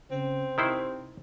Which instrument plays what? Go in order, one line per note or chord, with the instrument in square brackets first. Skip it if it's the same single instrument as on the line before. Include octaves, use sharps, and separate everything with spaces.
[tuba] C#3 [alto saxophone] C4
[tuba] C3 [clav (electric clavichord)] D#3 E4 C5